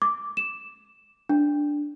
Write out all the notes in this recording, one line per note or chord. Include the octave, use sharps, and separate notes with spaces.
D6
E7
D4